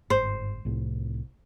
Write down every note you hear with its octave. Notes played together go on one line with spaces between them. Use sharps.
G1 G#2 C5
C2 A2